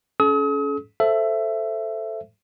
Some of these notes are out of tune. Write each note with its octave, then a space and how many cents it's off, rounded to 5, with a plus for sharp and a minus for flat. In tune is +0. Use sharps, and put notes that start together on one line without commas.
C#4 +15 A4 -45 D#6 +40
A4 +0 C5 +0 E5 +20